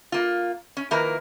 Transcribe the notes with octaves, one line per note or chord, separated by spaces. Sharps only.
A#3 F4
C#4
D#3 F3 A#3 E4 A#4 B4